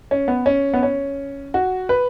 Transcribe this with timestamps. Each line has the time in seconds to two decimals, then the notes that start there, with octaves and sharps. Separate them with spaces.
0.11 C#4
0.28 B3
0.46 C#4
0.74 B3
0.83 C#4
1.54 F#4
1.89 B4